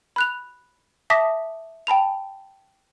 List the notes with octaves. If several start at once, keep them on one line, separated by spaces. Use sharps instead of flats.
B5 F#6 F7
E5 A5 D6 D#6 A#6 B6
G5 A5 B5 F7